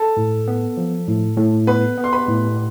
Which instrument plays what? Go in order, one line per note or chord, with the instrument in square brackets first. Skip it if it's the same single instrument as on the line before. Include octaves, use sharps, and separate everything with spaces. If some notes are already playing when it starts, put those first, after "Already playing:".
Already playing: [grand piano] A4 A5
[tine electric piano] A2
B3
F3
A2
A2
[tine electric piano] B3 [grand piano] B4 B5
[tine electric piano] B3
[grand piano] C6
B4 B5
[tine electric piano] A2